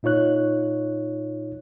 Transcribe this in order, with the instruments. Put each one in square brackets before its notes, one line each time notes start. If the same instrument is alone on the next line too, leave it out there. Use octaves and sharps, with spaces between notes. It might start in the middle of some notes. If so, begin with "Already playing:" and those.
[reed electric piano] A#2 D#4 F4 C#5 F#6